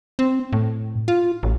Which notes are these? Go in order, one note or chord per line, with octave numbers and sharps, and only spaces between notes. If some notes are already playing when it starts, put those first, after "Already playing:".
C4
A2
F4
A1